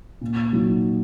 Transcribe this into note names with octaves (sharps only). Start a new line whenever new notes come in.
A#2
F#3 D#4